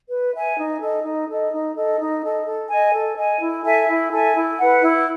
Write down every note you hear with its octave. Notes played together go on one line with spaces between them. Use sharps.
B4
E5 G#5
D#4
A4 D#5
D#4
A4 D#5
D#4
A4 D#5
D#4
A4 D#5
A4
D#5 G#5
A4
D#5 G#5
E4
A4 E5 G#5
E4
A4 E5 G#5
E4
B4 F#5
E4